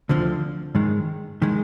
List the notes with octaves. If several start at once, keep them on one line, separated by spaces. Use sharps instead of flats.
D2 D3 F3 C4
G#2 D#3 G#3
D#3 G#3